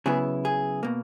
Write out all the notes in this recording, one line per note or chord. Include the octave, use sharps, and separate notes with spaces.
C#3 F#3 B3 E4 G#4
G#4
B2 A#3